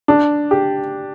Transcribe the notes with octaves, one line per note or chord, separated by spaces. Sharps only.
D4
G4